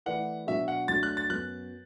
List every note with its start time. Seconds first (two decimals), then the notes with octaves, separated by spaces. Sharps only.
0.06 E3 A3 E4 B4 D5 F#5
0.47 B2 F#3 D4 F#4 E5
0.68 F#5
0.88 F#3 A3 D4 F#4 A6
1.03 F#6
1.17 A6
1.30 F#2 F#3 B3 F#6